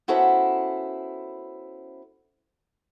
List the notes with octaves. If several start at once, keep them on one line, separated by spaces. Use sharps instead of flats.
B3 C#4 E4 F#4 A4 C5